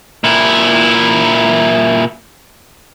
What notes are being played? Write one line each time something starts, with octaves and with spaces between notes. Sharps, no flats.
A#2 E4